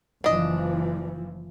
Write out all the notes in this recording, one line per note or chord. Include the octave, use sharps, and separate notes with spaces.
F#1 E3 F3 D4 D#5